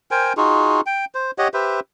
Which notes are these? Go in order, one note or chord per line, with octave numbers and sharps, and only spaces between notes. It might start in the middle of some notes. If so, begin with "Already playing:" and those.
A#4 C5 G5 G#5
D#4 F4 F#4 G#4
G5
C5
G4 C#5 D#5 F#5
G4 B4 C5 E5